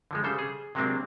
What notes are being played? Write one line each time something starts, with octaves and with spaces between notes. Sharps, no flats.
D3 F3 G#3
C#3 G3 A4 C5
G#4
C3 F#3 G#3 A#3 C4 D4